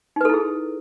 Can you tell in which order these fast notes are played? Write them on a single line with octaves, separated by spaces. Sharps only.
D#4 B4 A4 E4 G#4